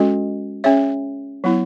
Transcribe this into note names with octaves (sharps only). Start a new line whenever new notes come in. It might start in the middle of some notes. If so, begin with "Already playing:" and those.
Already playing: G#3 C#4 F#4 A4 D#5
C#4 G#4 C#5 E5
F#3 B3 E4